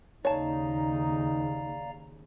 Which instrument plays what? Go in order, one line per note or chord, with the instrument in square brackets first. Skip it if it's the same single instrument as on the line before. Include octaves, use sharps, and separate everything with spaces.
[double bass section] D#2 C#3 [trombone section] D#4 [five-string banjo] C#5 A5 [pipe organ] D5 F5 A#5